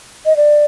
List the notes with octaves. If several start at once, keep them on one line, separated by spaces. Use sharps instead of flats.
D#5
D5